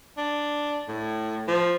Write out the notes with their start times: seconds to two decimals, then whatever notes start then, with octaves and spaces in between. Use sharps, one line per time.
0.18 D4
0.88 A2
1.48 F3